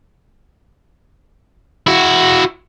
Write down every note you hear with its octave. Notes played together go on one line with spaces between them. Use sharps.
E4 F#4